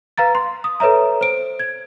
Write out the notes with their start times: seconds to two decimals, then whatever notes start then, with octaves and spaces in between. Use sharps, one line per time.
0.18 B4 F5 A#5 A6
0.35 C6
0.64 D#6
0.80 A4 B4 C#5 E5 A#5
1.21 C5 D7
1.60 G#6